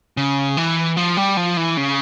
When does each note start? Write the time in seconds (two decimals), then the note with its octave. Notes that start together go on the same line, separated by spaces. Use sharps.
0.17 C#3
0.57 E3
0.97 F3
1.17 G3
1.37 F3
1.57 E3
1.77 C#3